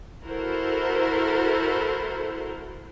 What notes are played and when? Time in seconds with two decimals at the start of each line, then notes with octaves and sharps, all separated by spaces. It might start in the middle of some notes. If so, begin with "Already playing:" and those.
0.25 E4 F#4 A4 A#4 C5